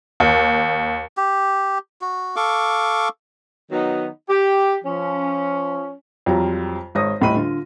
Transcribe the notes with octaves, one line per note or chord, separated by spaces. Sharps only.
D#2
G4
F#4
A4 F5 C#6 D6
D#3 F#3 B3 D#4
G4
F3 C#4
F2 F#3 G3 F4 A#5
G#1 C#5 D#6 A#6
D#1 A2 D#5 B5 D#7
D3 F4